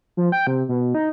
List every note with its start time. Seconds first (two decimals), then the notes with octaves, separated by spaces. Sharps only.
0.17 F3
0.32 G5
0.47 C3
0.69 B2
0.95 D#4